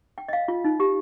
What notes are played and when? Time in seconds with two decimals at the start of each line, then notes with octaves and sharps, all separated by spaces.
0.18 G5
0.28 D#5
0.33 F5
0.48 F4
0.64 D#4
0.80 G4